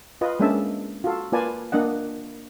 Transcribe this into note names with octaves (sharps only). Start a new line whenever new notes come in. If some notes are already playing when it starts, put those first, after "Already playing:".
F4 B4 D#5
G#3 A#3 C#4 D4 E5 A5
F4 F#4 A4
A#3 F4 B4 D5 G#5 A5
A#3 D4 D#5 F#5